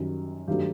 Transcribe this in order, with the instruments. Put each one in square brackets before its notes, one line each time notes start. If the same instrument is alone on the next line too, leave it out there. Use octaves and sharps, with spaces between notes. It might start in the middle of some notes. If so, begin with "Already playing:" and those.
Already playing: [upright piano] F#2 D#3 G3
G2 D#3 F#3 A3 G4